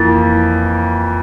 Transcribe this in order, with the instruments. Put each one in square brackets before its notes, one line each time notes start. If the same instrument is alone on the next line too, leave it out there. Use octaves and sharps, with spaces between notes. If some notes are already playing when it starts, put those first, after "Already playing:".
Already playing: [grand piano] F2 E3 A#3 E4 [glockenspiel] A6